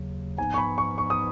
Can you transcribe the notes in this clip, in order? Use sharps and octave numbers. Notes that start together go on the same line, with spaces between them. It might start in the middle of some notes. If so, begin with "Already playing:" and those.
Already playing: D#2 C#3 F#3
G#2 F3 B3 D#4 G#5
C#6
B5
C#6
C#6
D#6